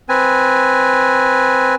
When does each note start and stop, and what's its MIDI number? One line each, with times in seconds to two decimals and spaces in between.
0.09 1.75 60
0.09 1.75 71
0.09 1.75 80